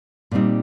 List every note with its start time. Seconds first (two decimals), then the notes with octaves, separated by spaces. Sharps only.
0.31 A#2 G3 C4 D#4